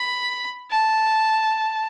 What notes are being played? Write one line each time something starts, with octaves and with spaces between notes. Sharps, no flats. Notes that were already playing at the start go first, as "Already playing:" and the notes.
Already playing: B5
A5